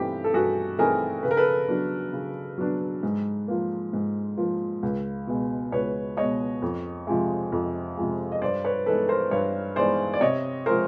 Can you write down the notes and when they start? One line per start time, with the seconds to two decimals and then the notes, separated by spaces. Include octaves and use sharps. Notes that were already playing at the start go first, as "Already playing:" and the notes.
Already playing: G2 E3 A3 C4 D#4 G4
0.24 A4
0.33 G2 F#4 G#4
0.78 E3 A3 C4 D#4 G#4 A#4
1.23 C#3 B4
1.31 A#4
1.37 A4 B4
1.69 F#3 B3 D4
2.13 C#3
2.58 F#3 B3 D4
3.03 G#2
3.48 F3 A#3
3.93 G#2
4.37 F3 A#3
4.83 C#2
5.27 B2 G#3
5.72 C#2 B4 C#5
6.17 B2 G#3 C#5 D#5
6.62 F2
7.07 C3 F3 G#3
7.52 F2
7.97 C3 F3 G#3
8.32 D#5
8.42 G2 C5 D5
8.64 B4 C#5
8.86 E3 G#3 B3 D#4 A4 B4
9.08 A#4 C5
9.31 G2 B4 C#5
9.76 E3 G#3 B3 D#4 C5 D5
10.13 D5
10.21 C3 C#5 D#5
10.66 F3 G#3 A#4 C5